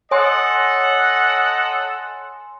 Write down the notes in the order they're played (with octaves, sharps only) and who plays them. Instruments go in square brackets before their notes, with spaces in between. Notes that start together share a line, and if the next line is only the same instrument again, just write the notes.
[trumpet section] A4 D#5 F#5 [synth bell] C#5 G#5 C6